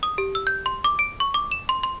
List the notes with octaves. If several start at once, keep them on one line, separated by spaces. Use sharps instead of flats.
D#6
G4
E6
G6
C6
D6
D7
C#6
D6
E7
C6
C6